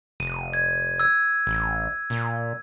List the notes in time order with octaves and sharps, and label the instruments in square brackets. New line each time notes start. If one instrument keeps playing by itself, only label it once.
[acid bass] F1 [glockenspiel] D#7
[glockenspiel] G#6
E6 G#6
[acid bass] A1
A#2